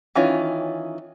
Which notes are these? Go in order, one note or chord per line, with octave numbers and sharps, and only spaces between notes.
D#3 E3 C#4 F4